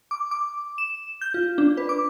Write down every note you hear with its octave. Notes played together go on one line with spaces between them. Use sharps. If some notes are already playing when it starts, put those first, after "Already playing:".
D6
D6
E7
G6
F4
D4
B4
D6